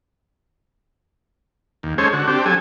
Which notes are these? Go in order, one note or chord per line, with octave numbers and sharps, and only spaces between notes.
D#2
G#3 C#4 A4 C5 C#5
D3 F#4
C4 D4 G4
F#3 A4 G#5